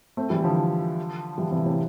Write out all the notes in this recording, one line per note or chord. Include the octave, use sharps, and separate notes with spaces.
A3 C4
E3 G3
D3 F3
E3 G3
C3 E3
A2 C3